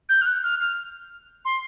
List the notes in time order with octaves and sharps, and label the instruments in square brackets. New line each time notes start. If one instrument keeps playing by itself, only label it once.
[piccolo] G6
F6
F#6
F6
F6
C6